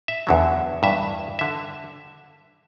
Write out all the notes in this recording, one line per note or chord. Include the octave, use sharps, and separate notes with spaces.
E5
E2 D3 F#3
G2 E3 E5
D3 E5